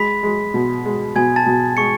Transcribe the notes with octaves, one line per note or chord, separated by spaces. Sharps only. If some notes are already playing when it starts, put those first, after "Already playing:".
Already playing: G#3 B5 B6
G#3
B2
G#3
B2 G#5 G#6
A5 A6
B2
G#3 C#6 C#7